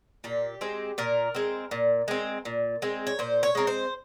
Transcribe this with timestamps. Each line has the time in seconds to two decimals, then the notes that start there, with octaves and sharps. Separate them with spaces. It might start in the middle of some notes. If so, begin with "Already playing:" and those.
0.24 A#2 G4
0.61 G#3 C4
0.98 A#2 A#4
1.35 G#3 C4
1.71 A#2
2.08 G#3 C4
2.45 A#2
2.82 G#3 C4
3.07 C#5
3.19 A#2 C5
3.43 C#5
3.55 G#3 C4 A#4
3.67 C5